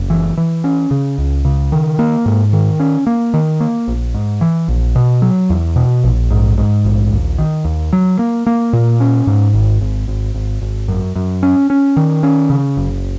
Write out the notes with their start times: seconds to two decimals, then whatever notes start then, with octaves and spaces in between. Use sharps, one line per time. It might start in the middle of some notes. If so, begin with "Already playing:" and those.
Already playing: F#1
0.10 E3
0.37 E3
0.64 C#4
0.91 C#3
1.18 C#2
1.45 C#3
1.72 D#3
1.99 A#3
2.26 G#2
2.53 D#3
2.80 C#4
3.07 A#3
3.34 D#3
3.60 A#3
3.88 A#1
4.14 G#2
4.41 E3
4.68 A#1
4.95 B2
5.22 F#3
5.50 E2
5.76 B2
6.04 A#1
6.30 G#2
6.58 G#2
6.84 A#1
7.11 D#2
7.38 D#3
7.65 D#2
7.93 F#3
8.19 A#3
8.47 A#3
8.73 A#2
9.00 C#4
9.27 G#2
9.54 G#1
9.81 G#1
10.08 G#1
10.35 G#1
10.62 G#1
10.88 F#2
11.16 F#2
11.43 C#4
11.70 C#4
11.97 D#3
12.23 C#4
12.50 C#3
12.77 F#1